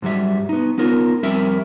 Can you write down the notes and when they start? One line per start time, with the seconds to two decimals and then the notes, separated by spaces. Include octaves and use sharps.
0.02 G#2 F#3 G3 E5
0.49 B3 D#4
0.78 B3 D#4 F4 A#4
1.23 F2 G3 C4 A#4 E5